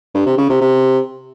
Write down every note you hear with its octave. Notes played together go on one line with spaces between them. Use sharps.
G2
C3
C#3
C3
C3